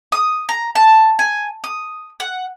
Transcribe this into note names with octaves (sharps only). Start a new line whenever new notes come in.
D#6
A#5
A5
G#5
D#6
F#5